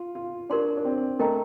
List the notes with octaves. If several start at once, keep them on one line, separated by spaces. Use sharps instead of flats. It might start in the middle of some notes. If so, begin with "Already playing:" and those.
Already playing: F4
F4
D4 G4 A#4 D5 A5 C6
D4
C4
A3 A#4 D#5 G5 A#5